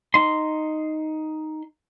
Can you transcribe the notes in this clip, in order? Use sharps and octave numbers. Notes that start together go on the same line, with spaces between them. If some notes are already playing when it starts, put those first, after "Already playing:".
D#4 C6